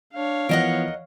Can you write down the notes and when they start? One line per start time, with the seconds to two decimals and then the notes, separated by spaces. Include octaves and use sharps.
0.14 D4 C#5 F5
0.49 E3 F3 B3 A#4 D#5 F#5